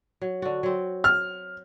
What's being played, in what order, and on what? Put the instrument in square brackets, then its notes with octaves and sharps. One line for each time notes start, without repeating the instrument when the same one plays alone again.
[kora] F#3
D3 F#4
F#3 C4
[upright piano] F6